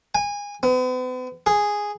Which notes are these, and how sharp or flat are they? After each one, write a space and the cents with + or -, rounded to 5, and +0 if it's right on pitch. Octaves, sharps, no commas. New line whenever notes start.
G#5 -25
B3 +45
G#4 -5